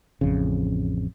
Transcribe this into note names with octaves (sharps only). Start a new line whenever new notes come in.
A1 F2 C#3